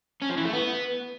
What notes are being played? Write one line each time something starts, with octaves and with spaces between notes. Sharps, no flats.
C#4
F3
E3
A3
B3